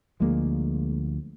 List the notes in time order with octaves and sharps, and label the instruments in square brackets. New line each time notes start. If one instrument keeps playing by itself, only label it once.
[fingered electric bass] D2 F3 [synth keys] G#3 A#3 G#4